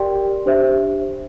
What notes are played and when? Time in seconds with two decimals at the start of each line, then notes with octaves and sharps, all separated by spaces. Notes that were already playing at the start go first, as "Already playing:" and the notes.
Already playing: G4 A#4 D5 G5 C6
0.46 D4 G4 C5 E5